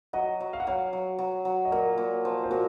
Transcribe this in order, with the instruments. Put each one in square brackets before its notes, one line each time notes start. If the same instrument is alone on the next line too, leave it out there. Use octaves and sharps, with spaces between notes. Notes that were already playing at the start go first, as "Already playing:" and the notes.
[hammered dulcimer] F#3 [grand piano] D#5 F#5
[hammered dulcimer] F#3
[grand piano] F5
F#5
[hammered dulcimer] F#3 [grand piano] C#5 F5
[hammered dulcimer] F#3
F#3
F#3
[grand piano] D#5
[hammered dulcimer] A#2 [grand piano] A#4 C#5
[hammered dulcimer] A#2
F3
[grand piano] C5
[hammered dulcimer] A#2 [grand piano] F#4 A#4